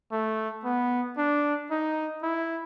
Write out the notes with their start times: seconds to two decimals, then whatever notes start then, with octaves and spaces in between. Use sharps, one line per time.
0.12 A3
0.64 B3
1.17 D4
1.71 D#4
2.23 E4